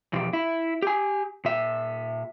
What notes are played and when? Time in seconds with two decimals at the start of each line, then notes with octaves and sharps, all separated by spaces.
0.13 E2 B2 F3 G4
0.33 E4
0.82 G4 G#5
1.45 A#2 E5